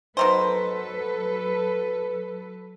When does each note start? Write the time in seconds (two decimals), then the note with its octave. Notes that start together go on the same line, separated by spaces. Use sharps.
0.17 B2 D#3 F#3 A4 B4 C5